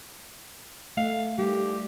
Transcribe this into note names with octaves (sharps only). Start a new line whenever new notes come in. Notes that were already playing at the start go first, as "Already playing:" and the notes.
A3 F5
G3 G4